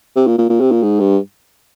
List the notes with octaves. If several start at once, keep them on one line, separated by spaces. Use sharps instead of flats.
C3
A#2
A#2
A#2
C3
A#2
G#2
G2